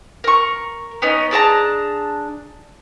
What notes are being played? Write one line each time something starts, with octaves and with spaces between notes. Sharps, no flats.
A#4 C#6
B3 C#4 D#4
D4 G#4 A5 A#5